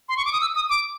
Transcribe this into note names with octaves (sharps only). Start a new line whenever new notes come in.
C6
C#6
D6
D#6
E6
D#6
D6